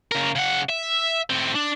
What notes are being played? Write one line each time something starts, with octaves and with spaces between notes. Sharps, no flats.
C#3 A#4
C#3 F#5
E5
A2 C4
D4